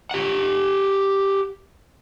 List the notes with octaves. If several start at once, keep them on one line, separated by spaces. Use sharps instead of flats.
G4 F#5